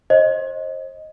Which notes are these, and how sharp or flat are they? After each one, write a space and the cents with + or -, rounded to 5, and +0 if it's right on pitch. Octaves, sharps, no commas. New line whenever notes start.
C5 +35 D#5 +0